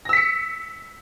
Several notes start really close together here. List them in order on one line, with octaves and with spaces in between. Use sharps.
A#6 E6 B6 C#7